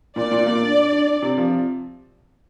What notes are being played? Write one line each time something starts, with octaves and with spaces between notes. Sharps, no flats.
A#2 D5
A#2
A#3
D4
D4
D4
D4
C3
F3